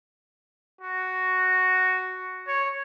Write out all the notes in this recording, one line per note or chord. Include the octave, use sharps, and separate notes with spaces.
F#4
C#5